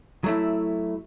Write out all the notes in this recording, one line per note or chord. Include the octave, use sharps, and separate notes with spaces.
F#3 A3 E4